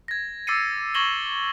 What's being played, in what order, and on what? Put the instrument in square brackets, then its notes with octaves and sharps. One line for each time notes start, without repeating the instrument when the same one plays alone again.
[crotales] G#6 A#6
D6 E6 A6 C7 C#7 D#7
C#6 G#6 A#6 E7 F#7 G7